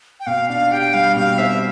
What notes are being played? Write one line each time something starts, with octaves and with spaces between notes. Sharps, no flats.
G5
B2 F5
D4 F5
G4 G5
G3 F5
B2 F5
C4 E5